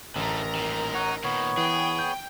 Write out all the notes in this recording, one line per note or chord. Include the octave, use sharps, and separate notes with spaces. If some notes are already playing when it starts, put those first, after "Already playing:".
A1 D3 A3 A#4 A#5
A#2 D#3
D#4 C#5 F#5
A#2 D#3 B3 C#5
E3 G#4 G5
G6